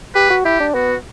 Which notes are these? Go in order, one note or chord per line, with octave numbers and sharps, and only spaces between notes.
G4 B4
F#4
E4 G4
D4
B3 F#4